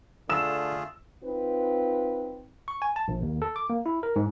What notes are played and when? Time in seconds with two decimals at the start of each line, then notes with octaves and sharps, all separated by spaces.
0.30 D3 A3 F4 G#4 E6 E7
1.24 C4 D#4 F4 B4
2.68 C#6
2.82 G#5
2.96 A5
3.08 A#1
3.22 D#2
3.42 A4
3.56 D6
3.70 A#3
3.86 E4
4.03 A#4
4.16 G#2